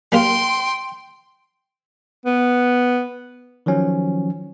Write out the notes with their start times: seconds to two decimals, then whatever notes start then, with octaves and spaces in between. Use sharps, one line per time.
0.12 G3 A#3 A#4 G5 C6
2.26 B3
3.66 D#3 F3 F#3 C#4